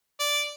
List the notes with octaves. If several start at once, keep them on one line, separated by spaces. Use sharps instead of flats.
D5